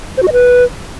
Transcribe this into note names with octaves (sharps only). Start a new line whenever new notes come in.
C5
F#4
D#5
B4